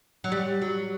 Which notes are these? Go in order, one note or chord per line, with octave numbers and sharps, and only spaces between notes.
F#3
G3
F#3